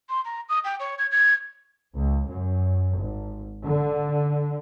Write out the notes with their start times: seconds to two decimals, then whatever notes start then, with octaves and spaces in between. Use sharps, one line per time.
0.10 C6
0.25 A#5
0.49 D#6
0.64 G5
0.80 C#5
0.98 G#6
1.11 G#6
1.94 C#2
2.25 F#2
2.95 G#1
3.64 D3